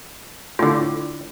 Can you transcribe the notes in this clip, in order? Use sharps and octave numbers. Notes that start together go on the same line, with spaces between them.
A2 D3 F4